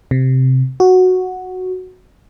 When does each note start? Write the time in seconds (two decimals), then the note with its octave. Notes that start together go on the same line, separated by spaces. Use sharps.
0.11 C3
0.80 F#4